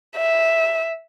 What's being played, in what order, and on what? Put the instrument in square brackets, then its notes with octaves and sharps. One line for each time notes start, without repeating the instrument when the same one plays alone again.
[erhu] E5